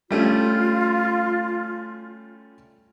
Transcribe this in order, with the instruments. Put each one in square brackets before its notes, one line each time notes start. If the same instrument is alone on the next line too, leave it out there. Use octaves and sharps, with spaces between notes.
[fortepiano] G3 A3 C#4 [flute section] F4